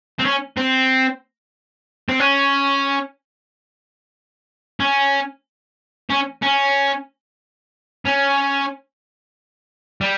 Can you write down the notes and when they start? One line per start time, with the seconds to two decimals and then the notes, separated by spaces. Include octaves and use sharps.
0.19 C4
0.25 C#4
0.57 C4
2.09 C4
2.20 C#4
4.80 C#4
6.10 C#4
6.43 C#4
8.05 C#4
10.01 G3